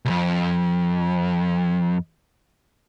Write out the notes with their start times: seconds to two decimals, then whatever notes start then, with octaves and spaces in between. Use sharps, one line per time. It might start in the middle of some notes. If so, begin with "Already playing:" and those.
0.05 C2 F2